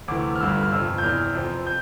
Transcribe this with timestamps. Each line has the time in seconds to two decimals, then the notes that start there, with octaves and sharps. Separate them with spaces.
0.08 D2 C3 E3 D6
0.36 F6
0.40 G1 G2 D3 G3 E6
0.63 F6
0.71 G1 F2 C3 E6
0.98 G6
1.03 E2 C3 E3 F6
1.34 F2 C3 F3 C4
1.67 G6